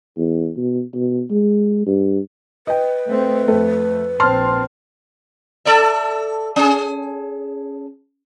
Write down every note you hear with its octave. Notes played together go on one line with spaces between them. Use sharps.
E2
B2
B2
G#3
G2
B4 D#5 G5
A3 C4
F2 A3
A#1 C4 A5 C6 F6
A4 D5 E5
C#4 G#4